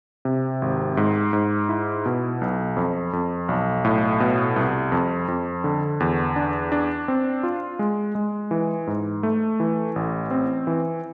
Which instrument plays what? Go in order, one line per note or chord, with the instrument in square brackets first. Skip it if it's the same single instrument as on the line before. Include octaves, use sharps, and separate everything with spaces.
[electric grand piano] C3
G#1
G#2
G#2
E4
B2
B1
F2
F2
B1
A2
B2
C2
F2
F2
D3
E2
D4
D4
C4
F4
G#3
G#3
E3
G#2
A3
E3
A1
C4
E3